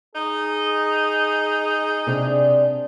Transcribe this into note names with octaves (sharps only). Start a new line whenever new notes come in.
D#4 G#4
C3 D4